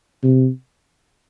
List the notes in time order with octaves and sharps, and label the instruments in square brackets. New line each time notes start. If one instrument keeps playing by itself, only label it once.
[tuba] C3